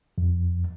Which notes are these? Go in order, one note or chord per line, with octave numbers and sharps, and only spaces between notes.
F2